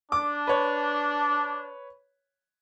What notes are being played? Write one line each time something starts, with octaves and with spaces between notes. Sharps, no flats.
D4 D6
B4 C#5